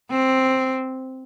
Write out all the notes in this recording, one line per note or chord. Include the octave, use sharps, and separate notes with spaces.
C4